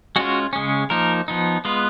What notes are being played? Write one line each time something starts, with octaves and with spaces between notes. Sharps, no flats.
G#3 C#4 F4 F#4
C#3 G#3 C#4
F3 A#3 D#4 A#4
F3 B3 D#4
G#3 B3 F4 B4